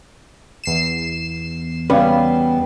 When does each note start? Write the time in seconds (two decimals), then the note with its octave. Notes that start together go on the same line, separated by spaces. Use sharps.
0.64 E2 C7 E7
1.90 C#3 G3 B3 C#4 B4